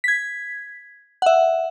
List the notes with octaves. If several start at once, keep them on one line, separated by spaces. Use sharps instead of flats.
G#6 B6
E5 F#5